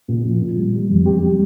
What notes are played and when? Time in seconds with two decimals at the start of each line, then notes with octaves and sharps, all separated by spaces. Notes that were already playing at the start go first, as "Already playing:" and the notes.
0.08 A#2
0.25 F3
0.41 A#2
0.58 G3
0.74 G3
0.90 F2
1.06 G3 G4
1.22 G3